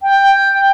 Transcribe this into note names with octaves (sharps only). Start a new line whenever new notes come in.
G5